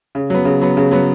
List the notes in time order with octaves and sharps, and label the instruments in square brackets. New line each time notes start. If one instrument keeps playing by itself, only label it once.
[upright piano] C#3
F#3 B3
C#3
F#3 B3
C#3
F#3 B3